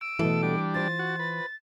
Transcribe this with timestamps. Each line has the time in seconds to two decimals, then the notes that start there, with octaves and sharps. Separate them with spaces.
0.01 E6 D7
0.19 B2 E3 A3 A4
0.43 G3 D4
0.74 F4 C5 A6
0.99 F#4
1.19 B4